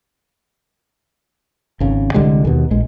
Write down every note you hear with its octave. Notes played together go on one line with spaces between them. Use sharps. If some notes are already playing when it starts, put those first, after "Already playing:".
G#1 C#3
C2 D3 G3 G#3
D#2 B2
A#1 G#3